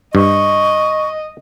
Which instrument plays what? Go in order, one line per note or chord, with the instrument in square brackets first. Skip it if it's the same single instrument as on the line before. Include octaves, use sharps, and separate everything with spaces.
[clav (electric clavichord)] G2 [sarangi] D#5 [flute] C#6